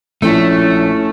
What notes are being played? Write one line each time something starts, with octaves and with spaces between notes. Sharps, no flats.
A#1 A3 C#4 E4